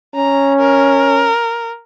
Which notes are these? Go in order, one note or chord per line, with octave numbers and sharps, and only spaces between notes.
C#4 A#5
A#4